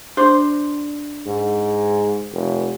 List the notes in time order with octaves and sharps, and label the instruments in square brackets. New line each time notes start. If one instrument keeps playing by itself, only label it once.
[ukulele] D4 C5
[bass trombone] G#2
F1